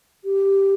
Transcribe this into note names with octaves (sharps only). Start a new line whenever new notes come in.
G4